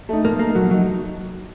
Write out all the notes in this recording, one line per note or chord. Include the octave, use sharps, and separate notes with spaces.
A3 D#4
A#2 A#3
A3 A#3 D#4
A#2 F#3
F#3 A3 D#4